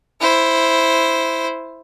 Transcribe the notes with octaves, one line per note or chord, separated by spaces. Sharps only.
E4 C5